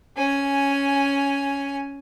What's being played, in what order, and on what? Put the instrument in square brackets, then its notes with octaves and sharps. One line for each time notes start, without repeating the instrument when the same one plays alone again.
[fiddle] C#4 G#5